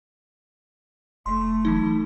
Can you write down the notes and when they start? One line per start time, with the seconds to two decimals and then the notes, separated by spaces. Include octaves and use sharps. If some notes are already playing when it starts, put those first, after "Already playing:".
1.26 F1 A3 C6
1.65 E3 F#3 D#4